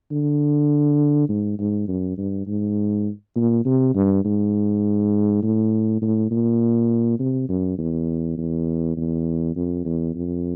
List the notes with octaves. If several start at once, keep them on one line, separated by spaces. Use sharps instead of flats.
D3
G#2
G#2
F#2
G2
G#2
A#2
C3
G2
G#2
A2
A2
A#2
C3
F#2
E2
E2
E2
F2
E2
F2